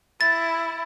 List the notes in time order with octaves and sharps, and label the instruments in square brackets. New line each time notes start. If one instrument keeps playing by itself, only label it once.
[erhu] E4 [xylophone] A6